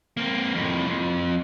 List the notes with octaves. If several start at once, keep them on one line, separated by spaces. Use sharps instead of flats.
A#3 C4
F2 A2
F2